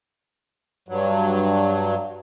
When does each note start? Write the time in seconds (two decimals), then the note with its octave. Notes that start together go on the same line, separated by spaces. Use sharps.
0.89 G2 F#3